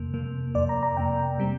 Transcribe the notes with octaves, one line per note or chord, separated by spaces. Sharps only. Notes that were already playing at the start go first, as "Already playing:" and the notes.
Already playing: F2 C3 A#3
F2 C3 A#3
F2 C3 A#3 D5
A#5
A#5
F2 C3 A#3 G5
C3 G3 C4